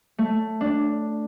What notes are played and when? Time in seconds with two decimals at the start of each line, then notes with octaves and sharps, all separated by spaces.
0.18 A3
0.61 D4